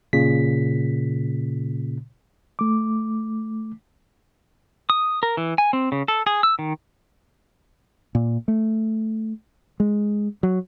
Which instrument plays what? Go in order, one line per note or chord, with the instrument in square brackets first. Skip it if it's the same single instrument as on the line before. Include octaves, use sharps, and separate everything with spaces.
[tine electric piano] A#2 C#3 B6
[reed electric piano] A3 D6
[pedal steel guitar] D#6
A#4
E3
G#5
C4
C#3
A4
G#4
E6
D#3
[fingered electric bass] A#2
A3
G#3
F#3